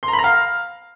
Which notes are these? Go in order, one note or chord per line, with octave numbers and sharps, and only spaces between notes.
C6
A#5
B5
A#5
F5